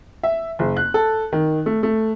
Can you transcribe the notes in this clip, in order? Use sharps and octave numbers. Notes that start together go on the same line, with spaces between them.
E5
F#1
F#6
A4
D#3
A3
A3